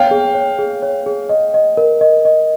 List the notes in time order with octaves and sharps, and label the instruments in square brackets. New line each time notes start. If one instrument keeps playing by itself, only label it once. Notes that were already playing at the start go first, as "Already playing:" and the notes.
Already playing: [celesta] C#5 [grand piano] F5 G5
[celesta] G#4
C#5
G#4
C#5
G#4
D#5
D#5
A#4
D#5
D#5